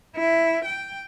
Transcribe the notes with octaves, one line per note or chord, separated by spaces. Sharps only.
E4
G5